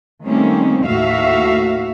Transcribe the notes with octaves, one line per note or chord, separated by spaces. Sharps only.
D#3 G3 A3 A#3 C4 C#4
D#2 A2 A3 F#4 E5 F5